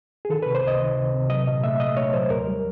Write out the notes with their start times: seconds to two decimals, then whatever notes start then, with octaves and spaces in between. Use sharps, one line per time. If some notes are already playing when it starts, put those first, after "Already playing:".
0.25 G#4
0.30 D#3 A4
0.42 B4
0.46 C3
0.55 C5
0.64 C#2 D#5
0.80 D#3
0.97 C3
1.14 C3
1.30 F#3 D#5
1.47 A#2 D#5
1.64 A3 E5
1.80 A3 D#5
1.97 A3 C#5
2.14 F#3 C5
2.30 D#2 A#4
2.47 G3